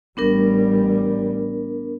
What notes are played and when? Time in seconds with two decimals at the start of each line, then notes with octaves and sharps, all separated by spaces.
0.17 A1 G3 B3 D4 A#4